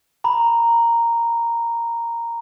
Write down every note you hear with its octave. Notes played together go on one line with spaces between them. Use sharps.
A#5 B5